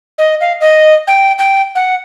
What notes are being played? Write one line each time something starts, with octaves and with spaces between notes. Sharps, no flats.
D#5
F5
D#5
G5
G5
F#5